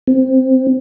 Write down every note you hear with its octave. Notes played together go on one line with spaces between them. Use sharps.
C4